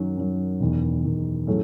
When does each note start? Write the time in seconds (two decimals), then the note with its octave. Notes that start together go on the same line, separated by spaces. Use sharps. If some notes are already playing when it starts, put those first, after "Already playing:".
Already playing: F#2 D#3 F#3
0.17 F#2 D#3 F#3
0.60 E1 E2 D#3
1.04 E1 E2 D#3
1.47 A2 F#3 A3 C#4 G#4